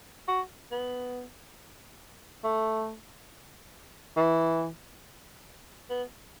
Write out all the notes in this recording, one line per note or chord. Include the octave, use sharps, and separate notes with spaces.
F#4
B3
A3
E3
B3